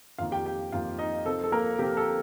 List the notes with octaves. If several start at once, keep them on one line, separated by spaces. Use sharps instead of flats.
F2 D#3 A#3 F4 F5
G4 G5
G4 G5
F2 D#3 A#3 F4 F5
D#4 D#5
C3 F3 C4 A4
A4
A#3 A#4
C3 F3 C4 G4
A4